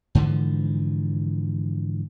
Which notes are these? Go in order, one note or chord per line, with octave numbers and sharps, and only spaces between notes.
G#2 D3 E3 F3